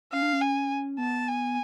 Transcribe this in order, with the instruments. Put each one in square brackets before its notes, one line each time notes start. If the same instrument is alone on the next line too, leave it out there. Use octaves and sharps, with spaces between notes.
[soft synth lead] C#4 [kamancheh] F5
[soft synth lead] D4
C#4
[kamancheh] G#5
[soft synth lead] B3 [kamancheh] A5
[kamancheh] G#5